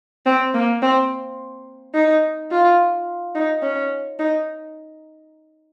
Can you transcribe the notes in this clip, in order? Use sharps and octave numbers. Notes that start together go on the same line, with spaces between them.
C4
A#3
C4
D#4
F4
D#4
C#4
D#4